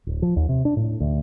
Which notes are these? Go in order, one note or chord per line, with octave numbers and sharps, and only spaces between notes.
D1
F3
D#2
C3
D4
A2
D2